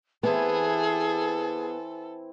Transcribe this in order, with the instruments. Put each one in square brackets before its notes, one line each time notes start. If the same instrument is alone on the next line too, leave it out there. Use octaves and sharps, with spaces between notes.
[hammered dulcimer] E3 C4 E4 [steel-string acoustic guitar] B3 [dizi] G#4 [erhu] A4